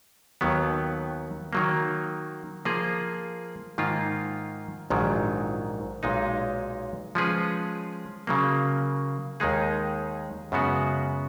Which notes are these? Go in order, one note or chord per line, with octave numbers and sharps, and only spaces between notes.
D#2 D#3 F#3 B3
D#3 F#3 A#3
F3 A#3 F4 G#4
G#2 D#3 A#3 F4
A#1 G#2 D#3 F#3
B1 A#2 G#3 D#4
F3 G#3 C#4 G#4 B4
C#3 F#3 A#3
D#2 D#3 G#3 D#4 G#4
F#2 C#3 G#3 B3 F#4